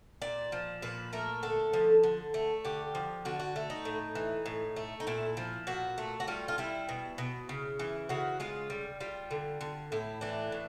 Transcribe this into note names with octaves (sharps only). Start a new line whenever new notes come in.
A#2 D5
F3
A#2 B4
A3 A#4
D3 A4
F3
D3
A3
D3 G4
F3
D3 F#4
F#4
A3
D#4
A2
E3
A2
A3
D#4
A#2 E4
F3
A#2 F#4
A3
F#4
G3 F4
F4
G3 E4
B2
B2
C#3
E3
C#3 F#4
G#3 F4
G3
G3 F4
D3
D3
A2 E4
E3 D4
A2